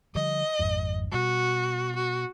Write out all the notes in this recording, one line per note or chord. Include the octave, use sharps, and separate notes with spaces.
D3 F3 G3 D#5
G#1 F2 G#2
B2 G3 F#4
F#4